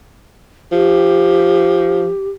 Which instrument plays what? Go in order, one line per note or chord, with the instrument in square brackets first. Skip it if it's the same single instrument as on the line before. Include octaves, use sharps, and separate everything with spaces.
[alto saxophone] F3 [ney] G4